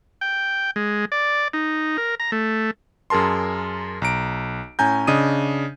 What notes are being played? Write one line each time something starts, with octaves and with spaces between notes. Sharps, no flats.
G5
G#3
D5
D#4
A#4
A#5
A3
F#2 G#4 A#4 A5 C6
B1 A#5 D7
A2 C#4 G#5 A#5 G6
C#3 D4 D#5 D#6 D#7